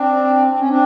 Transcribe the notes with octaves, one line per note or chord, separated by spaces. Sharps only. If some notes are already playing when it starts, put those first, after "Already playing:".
Already playing: C4 D4
C4
C#4
C4 D4